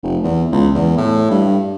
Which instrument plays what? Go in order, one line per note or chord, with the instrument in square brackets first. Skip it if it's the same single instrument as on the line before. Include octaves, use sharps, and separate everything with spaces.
[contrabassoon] F1
E2
C#2
E2
A2
G2